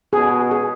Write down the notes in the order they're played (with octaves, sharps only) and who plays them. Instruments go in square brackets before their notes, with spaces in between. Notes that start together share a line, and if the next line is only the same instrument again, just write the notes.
[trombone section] B2 [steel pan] G#4
[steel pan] G#4